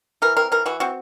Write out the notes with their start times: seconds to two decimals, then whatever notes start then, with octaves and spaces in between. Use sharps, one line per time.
0.22 E3 A#4
0.37 C4 A#4
0.52 E3 A#4
0.66 E3 F#4
0.80 C4 F#4